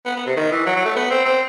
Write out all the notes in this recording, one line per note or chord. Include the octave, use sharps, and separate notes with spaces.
B3
B3
C3
D#3
E3
F#3
F#3
A3
B3
C4
C4